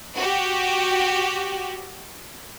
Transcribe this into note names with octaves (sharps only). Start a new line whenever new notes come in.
F#4 G4